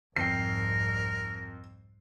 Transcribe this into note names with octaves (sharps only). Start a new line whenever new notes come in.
C2 F2 G#2 A#4 G5 C7